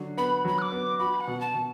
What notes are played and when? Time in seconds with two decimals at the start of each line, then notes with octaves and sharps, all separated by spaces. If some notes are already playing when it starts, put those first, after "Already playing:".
Already playing: D3 F#3
0.18 B3 B5
0.45 F#3 B5
0.58 F#6
0.62 D6
0.72 B3
0.99 F#4 B5
1.20 F#5
1.27 B2
1.41 A5
1.55 B2